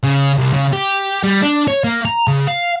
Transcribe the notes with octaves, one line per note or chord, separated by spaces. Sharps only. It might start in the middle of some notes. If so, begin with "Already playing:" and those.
C#3
C2
C#3
G4
G3
D4
C#5
A#3
A#5
C#3
F5